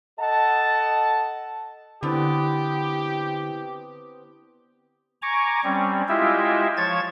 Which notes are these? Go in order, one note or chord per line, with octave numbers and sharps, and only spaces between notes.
A4 D#5 F#5 A5
D3 B3 C4 D4 E4 G4
G#5 A#5 C#6 D6
G3 C4 C#4
G#3 E4 F4 G4 E5
F3 C#5 A5 G#6 A6